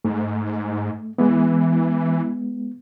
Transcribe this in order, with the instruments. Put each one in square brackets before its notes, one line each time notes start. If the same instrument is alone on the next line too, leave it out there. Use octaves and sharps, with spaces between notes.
[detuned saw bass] G#2 [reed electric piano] A3
[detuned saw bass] E3 [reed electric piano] G#3 B3